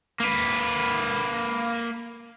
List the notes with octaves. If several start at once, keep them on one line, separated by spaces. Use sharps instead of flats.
A#3 B4